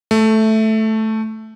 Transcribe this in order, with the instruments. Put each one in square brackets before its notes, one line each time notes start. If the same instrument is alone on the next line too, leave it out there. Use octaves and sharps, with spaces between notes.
[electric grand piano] A3